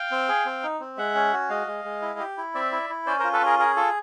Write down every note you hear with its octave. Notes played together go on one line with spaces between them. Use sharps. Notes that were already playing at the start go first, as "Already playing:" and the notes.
Already playing: F5 G5
C4
G#4
C4
D#4
C4
G#3 E5 F#5
C#4
F#4
G#3 D#5 F5
G#3
G#3
E4
G4
E4
C4 D5 E5
E4
E4
C#4 C5 D5
A#4 C5
F4
A4 B4
C#4 G#4 A#4
G#4 A#4
F4 A4